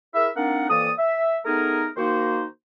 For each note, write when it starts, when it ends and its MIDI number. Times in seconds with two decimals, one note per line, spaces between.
0.14 0.29 64
0.14 0.29 68
0.14 0.29 70
0.14 0.29 76
0.37 0.67 58
0.37 0.67 60
0.37 0.67 62
0.37 0.67 63
0.37 0.67 70
0.37 0.67 78
0.69 0.91 41
0.69 0.91 52
0.69 0.91 58
0.69 0.91 74
0.69 0.91 87
0.98 1.37 76
1.45 1.86 57
1.45 1.86 59
1.45 1.86 63
1.45 1.86 68
1.45 1.86 70
1.97 2.44 51
1.97 2.44 58
1.97 2.44 63
1.97 2.44 66
1.97 2.44 72